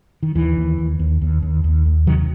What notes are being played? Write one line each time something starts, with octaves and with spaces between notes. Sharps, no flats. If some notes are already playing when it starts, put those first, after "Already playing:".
D#3
D#2 E3
D#2
D#2
D#2
D#2
D#2
D#2
D#2
C3 D#3 F#3